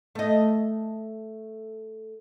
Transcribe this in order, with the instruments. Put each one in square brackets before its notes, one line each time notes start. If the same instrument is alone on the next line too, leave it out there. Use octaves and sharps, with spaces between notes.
[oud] A3 D#5